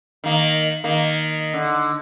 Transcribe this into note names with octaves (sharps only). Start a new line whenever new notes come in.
D#3 A#3
D#3 A#3
D3